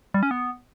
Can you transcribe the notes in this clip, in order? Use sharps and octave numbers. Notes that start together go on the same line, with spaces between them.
G3
C#4
B3